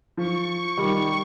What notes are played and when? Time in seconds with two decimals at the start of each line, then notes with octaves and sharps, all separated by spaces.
0.17 F3 C#6
0.77 D#3 G3